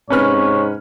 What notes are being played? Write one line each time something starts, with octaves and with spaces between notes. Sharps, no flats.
G#2 C3 C#4 B4 C#5 F6